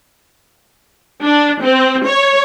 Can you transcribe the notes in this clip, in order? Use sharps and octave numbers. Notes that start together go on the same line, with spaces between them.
D4
C4
C#5